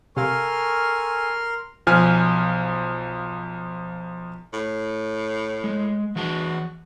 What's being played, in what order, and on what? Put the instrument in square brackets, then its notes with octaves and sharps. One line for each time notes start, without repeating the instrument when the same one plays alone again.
[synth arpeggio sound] C3 F5 [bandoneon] A4 G#5 [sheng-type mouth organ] A#4 C6 F6 [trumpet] C#6
[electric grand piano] B1 F3 G#5 F6
[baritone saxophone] A2
[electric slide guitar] G#3
[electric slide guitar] E3 G#4 A5 [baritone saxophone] F#4